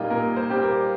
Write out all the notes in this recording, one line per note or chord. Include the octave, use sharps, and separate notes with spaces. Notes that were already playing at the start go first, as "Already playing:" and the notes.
Already playing: A#2 G3 A#3 D#4 F4
A#2 A#4
C5
G3 A#3 G4
A#4